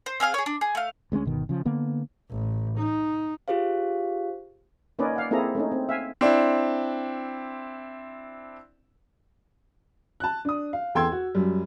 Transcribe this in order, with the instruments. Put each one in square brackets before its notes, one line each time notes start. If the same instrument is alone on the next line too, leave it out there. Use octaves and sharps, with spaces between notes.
[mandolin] C5
C4 G#4 F5 F6
G#4 C#5
D4
G#4
A3 F5
[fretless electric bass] D2 G#3 A#3 C#4
G1 B2 D#3
C#3 F3
D3 A#3 B3
[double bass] A1
D#4
[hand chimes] F4 G4 G#4 C5 F5
[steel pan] A#3 C#4 D#4 B4 D5 D#5
D5 F5 F#5
A#3 C4 E4 G#4 A4 A#5
A3 C#4 D#4
C4
E5 F5 G#5
[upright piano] C4 D4 E4
A5 F#6
D4 D#6
F5
E2 A4 G5 C6 E6 G#6
F#4
F#2 G3